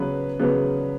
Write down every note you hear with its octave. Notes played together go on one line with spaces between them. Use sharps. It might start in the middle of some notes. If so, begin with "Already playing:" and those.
Already playing: C#3 F#3 B3 B4
C#3 F#3 B3